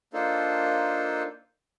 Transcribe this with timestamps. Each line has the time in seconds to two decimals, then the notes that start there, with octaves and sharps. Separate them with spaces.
0.13 A#3 D4 D#4 F4 A4 C5